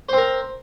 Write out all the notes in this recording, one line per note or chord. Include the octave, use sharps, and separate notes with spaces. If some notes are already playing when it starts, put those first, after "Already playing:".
C4 A#4 C5